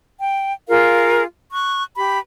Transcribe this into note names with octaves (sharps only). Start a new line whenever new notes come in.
G5
F4 G#4 A#4 F5
C#6 F#6
G4 B5